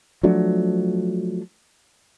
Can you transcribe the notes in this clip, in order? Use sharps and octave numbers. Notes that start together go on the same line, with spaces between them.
F3 F#3 A3 D4